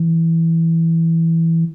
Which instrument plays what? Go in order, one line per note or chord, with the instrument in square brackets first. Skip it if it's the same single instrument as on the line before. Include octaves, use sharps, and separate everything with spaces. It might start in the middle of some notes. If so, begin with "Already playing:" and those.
Already playing: [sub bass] E3